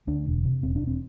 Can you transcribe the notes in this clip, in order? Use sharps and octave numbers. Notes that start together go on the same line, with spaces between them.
D2 D4
E1
C3
E1 C4
D4
E1
C4